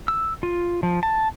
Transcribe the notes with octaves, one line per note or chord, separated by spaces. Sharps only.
E6
F4
F3
A5